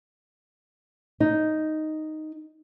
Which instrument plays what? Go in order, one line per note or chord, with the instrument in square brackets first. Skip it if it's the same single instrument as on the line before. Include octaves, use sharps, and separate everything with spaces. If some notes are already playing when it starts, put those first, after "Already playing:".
[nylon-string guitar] D#4